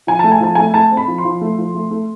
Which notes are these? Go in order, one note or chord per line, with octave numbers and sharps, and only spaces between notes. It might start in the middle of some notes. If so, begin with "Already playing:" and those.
F3 G#5
A3 A5
G#5
F3 A5
A3 G#5
A3 A5
C4
B5
F3
C6
F3
A3
F3
A3
A3